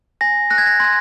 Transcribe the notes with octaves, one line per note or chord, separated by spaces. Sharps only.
G#5 A#6
F#6 A#6
G#6
A#6
C6 G#6